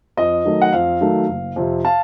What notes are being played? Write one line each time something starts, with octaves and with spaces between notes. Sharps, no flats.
F2 D#5
D#3 F#3 A3
F#5
F2 F5
D#3 F#3 A3
F#1
F2 C3
F5 A5